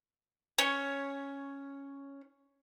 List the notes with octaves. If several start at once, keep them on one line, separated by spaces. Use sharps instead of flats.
C#4 C#5